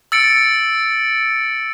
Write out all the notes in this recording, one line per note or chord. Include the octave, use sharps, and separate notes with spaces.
E6 A6 C#7 D7